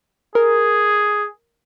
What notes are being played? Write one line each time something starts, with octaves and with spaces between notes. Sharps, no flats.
G#4 A#4